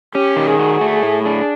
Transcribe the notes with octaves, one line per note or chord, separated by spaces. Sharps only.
C#4 G4
D#3
G#4
F#4
A3
A2
D4